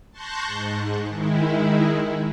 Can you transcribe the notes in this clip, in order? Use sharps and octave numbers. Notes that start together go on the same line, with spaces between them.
A5 C6 C#6 F#6 G6 A#6
G#2
D#3 G#3 E4